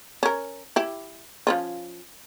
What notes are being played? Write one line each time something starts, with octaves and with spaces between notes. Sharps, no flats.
C#4 A#4
E4 G4
F3 C#4 F4